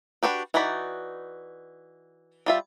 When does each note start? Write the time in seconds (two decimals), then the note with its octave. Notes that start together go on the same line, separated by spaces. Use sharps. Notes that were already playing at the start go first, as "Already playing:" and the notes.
0.23 D4 F#4 G4 B4
0.54 E3 D#4 F#4 D5 B5
2.46 G3 F4 E5